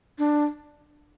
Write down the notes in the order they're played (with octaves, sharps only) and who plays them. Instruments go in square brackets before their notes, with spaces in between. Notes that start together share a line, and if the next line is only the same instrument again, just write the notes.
[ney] D4